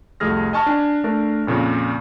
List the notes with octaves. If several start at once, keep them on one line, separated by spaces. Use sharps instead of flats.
C2 F2 A3 G#4 F6 A#6
D#5 G#5 A5 C#6 F6
D4 G#5
A3 D4 A#4
F2 A#2 C#3